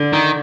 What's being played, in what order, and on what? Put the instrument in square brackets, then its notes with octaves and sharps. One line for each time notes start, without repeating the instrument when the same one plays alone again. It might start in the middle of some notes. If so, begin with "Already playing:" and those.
Already playing: [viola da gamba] D3
[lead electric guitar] D#3